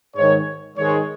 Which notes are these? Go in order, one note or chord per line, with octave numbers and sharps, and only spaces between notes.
G#2 D#3 G#3 C#5
G#2 D#3 G#3 C#5